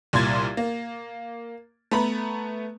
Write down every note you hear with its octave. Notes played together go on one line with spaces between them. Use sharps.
C2 A#2 C6 G#6 A6
A#3
A3 B3 A#5 B5